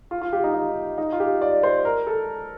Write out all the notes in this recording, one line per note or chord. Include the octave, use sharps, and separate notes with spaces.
F4
F4
G4
D#4
D#4
D#4
F4
G4
D5
C5
A#4
A4